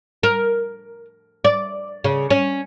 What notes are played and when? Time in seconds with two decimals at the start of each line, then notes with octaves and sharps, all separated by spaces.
0.23 A#4
1.45 D5
2.04 C#3
2.30 C#4